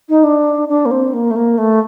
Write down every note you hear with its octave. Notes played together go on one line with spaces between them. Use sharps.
D#4
D4
D4
A#3
C4
A#3
A3
A#3
A3